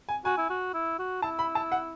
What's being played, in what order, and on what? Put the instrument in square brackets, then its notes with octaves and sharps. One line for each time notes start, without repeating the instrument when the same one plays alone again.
[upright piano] G#5
[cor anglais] F#4 [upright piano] G#5
[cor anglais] E4
F#4
E4
F#4
[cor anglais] E4 [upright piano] A5
[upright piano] B5
A5
F#5